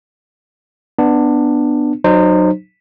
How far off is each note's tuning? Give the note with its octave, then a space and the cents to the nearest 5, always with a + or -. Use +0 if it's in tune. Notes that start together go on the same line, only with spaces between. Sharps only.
B3 +0 D4 +15
F#3 +0 D#4 -35 C5 +0